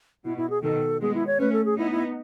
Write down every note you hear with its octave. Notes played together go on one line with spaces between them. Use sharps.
B2 E4
E4
G#4
B2 D#3 A4
G#3 B3 G#4
E4
C#5
A3 C#4 B4
A4
G#4
B3 D#4 E4
E4